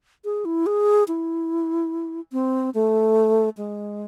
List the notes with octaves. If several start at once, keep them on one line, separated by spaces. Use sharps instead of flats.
G#4
E4
G#4
E4
C4
A3
G#3